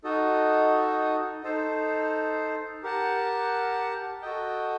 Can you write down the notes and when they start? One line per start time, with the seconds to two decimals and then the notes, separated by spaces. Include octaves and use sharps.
0.04 D#4 F#4 A4 D#5
1.44 D#4 A4 C5
2.83 G4 A#4 F#5 A5
4.22 F#4 A4 D#5 G5